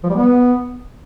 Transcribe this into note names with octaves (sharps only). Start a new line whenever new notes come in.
F3
G3
B3